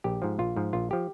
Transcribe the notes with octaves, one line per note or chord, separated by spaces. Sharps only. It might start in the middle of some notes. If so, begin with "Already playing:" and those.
A#1 G4
G#2 F3
A#1 F4
G#2 F3
A#1 F4
F3 G4